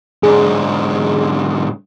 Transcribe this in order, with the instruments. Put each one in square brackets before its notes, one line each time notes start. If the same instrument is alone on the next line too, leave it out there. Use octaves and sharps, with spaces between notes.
[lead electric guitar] G#2 D3 [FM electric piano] G#4